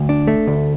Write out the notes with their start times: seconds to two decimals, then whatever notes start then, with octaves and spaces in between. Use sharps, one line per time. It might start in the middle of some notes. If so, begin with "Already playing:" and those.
Already playing: D2
0.09 D4
0.27 A3
0.47 D2